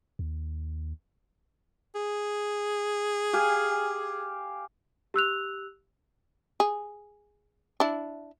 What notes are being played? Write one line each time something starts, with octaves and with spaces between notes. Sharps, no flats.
D#2
G#4
G4 F5 G#5
G4 E6 F#6 F7
G#4
D4 E4